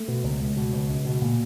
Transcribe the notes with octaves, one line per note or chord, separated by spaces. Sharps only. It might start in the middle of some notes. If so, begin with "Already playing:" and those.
Already playing: A3
B2
C#2
C#2
B2
C#2
C#2
B2
A#2